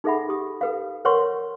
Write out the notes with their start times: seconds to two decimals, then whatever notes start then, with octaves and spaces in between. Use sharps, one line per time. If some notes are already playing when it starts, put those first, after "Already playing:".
0.04 D#4 G#4 A4 E5 F#5 B5
0.29 G4 D#6
0.61 A4 B4 F5
1.05 A#4 B4 C#5 F#5 C6 C#6